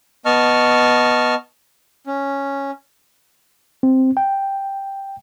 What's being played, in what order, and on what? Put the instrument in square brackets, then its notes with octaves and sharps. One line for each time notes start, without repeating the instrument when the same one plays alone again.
[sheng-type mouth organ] B3 D#5 A5 C#6 F6
C#4
[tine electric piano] C4
G5